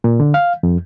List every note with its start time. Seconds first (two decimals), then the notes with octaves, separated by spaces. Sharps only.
0.04 A#2
0.20 D3
0.34 F5
0.63 F2